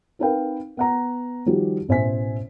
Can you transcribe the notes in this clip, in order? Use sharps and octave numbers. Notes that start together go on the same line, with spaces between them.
C4 D#4 A#4 B4 F5 G5
B3 F#5 A#5
D#3 F3 G3 F#4 G4
A1 B2 C5 E5 G#5 B6